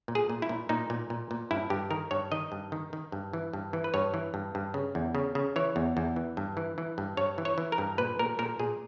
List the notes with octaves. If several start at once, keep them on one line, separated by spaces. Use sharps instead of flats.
A#2
G#4
A#2
E4
A#2
A#2 D#4
A#2
A#2
A#2
G2 E4
G2 G4
D#3 A#4
G2 C#5
D#3 D#5
G2
D#3
D#3
G2
E3
G2
E3
B4
G2 C#5
E3
G2
G2
C#3
E2
C#3
C#3
E3 C#5
E2
E2
E3
G2
E3
E3
G2
G2 C#5
E3
C#5
E3
A#4
G2
A#2 B4
A#2 A#4
A#2 A#4
A#2 G#4